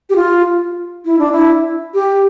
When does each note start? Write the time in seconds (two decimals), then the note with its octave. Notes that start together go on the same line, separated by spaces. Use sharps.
0.10 G4
0.16 F4
1.06 E4
1.19 D4
1.32 E4
1.94 G4